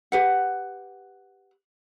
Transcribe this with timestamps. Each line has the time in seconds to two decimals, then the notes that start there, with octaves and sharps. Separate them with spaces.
0.12 G4 B4 F#5